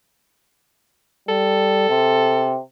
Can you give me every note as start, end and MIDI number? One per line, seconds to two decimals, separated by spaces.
1.29 1.87 55
1.29 2.55 69
1.89 2.59 48